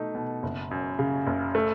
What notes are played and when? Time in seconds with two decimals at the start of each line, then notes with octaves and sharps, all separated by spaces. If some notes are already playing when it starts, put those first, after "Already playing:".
Already playing: B2 A3 D#4
0.15 B2
0.43 F#1
0.71 F#2
0.99 C#3
1.27 F#1
1.55 A3